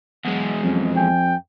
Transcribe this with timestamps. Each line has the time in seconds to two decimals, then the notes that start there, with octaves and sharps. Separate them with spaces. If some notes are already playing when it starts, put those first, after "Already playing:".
0.25 E2 F#3 G#3 F#5
0.63 F2 F#3 C#4
0.96 F3 G5 G#5